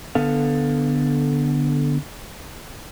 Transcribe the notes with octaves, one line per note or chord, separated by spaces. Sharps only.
D3 B3 A4 F5